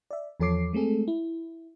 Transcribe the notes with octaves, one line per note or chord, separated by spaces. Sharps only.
D5 E5
E2 F3 A4 C#5 D6 C7
G#3 A3 C4 G#4 A4
E4